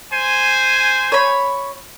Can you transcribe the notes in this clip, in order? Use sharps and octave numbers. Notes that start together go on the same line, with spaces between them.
C5 G#5
C#5 B5